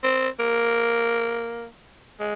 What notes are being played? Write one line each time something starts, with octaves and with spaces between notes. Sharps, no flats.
C4
A#3
G#3